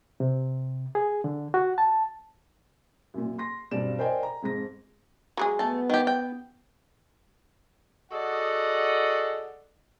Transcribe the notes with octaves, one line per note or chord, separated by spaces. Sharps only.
C3
G#4
D3
F#4
A5
F#2 A#2
C6 A#6
B1 G2 C4 D5 E7
A#4 C5 D5 D#5 G5 G#5
A#5
F2 G#2 A#6
F#3 G#3 G#4
A3 B3 A5
D#3 G4
G5
F#4 G#4 A4 D5 D#5 F#5